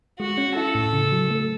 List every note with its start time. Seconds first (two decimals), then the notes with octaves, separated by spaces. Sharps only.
0.20 G#3 F#4
0.37 C#4
0.56 E4 A4
0.75 A2
0.93 C#3
1.12 F#3
1.31 A3